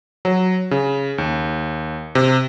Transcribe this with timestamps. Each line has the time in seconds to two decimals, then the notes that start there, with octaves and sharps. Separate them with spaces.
0.25 F#3
0.71 C#3
1.18 D#2
2.15 C3